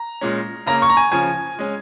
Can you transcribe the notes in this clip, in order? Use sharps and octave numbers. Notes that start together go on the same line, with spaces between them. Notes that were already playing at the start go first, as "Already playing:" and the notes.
Already playing: A#5
A#2 G#3 C#4
C#3 A#3 C#4 A#5
C#6
A#5
G#5
C#3 F3 C#4 G#5
G#3 C#4